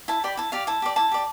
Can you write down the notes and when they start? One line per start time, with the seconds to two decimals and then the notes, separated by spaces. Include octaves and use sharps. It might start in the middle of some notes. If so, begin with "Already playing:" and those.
0.08 E4 A5
0.24 G4 D5 B5
0.37 E4 A5
0.52 G4 D5 F5
0.67 E4 A5
0.82 G4 D5
0.96 E4 A5
1.11 G4 D5